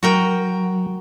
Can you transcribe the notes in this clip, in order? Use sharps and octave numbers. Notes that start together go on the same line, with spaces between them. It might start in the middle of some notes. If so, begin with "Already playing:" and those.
F#3 F#4 A#4 G5